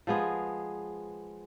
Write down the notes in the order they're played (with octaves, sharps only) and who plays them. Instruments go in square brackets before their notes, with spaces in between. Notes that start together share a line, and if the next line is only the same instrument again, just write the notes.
[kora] F3 G#3 B3 G#4